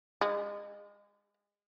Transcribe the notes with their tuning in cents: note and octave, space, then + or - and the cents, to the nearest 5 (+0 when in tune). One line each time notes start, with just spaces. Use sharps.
G#3 -30